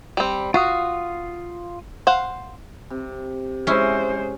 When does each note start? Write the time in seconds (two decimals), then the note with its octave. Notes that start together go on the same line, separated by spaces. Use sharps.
0.17 G3 C4
0.54 F4 F#4 F5 D#6
2.07 C5 F5 F#5
2.90 C3
3.67 G#3 C#4 E4 C5